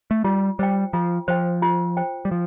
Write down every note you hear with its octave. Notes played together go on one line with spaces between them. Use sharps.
A3
G3 F4
G3 C5 G5
F3 F4
F3 C5 G5
F4
C5 G5
G3
F3